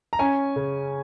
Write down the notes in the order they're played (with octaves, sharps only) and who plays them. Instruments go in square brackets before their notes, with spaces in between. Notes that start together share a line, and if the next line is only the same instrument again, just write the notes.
[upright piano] A#5
C#4 G#5
C#3